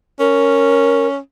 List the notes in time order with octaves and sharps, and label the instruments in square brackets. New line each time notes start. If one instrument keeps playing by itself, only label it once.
[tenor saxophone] C#4 [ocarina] A#4